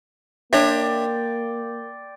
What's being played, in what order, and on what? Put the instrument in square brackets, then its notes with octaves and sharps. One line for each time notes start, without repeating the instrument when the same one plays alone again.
[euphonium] A#3 [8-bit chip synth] D4 C#5 E5 [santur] D5 G5 C6